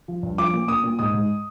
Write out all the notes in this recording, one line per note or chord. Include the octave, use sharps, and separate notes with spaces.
F3
G2
F3 D6
A#2
A#2 D#6
A#2
G#2 D#6
G#2